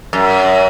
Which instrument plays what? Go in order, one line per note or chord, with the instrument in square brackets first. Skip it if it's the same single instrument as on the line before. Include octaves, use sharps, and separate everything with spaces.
[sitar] F#2